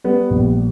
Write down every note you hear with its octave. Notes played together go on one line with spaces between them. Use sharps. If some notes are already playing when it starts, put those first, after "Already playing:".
G3 B3
A#1